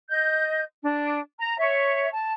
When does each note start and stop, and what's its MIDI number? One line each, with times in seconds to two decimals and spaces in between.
0.10 0.62 75
0.10 0.62 91
0.84 1.18 62
1.40 1.56 82
1.59 2.09 73
1.59 2.09 76
2.12 2.32 81